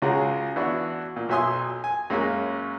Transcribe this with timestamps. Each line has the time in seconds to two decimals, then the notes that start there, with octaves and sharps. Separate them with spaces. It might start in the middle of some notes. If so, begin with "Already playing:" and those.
0.02 C#2 C#3 F#4 G#4 A#5
0.56 E3 B3 D4 E4 F#4
1.16 A#2
1.29 B1 F#3 E5 G#5 C6 D#6
1.84 G#5
2.10 F#2 G#3 A#3 C#4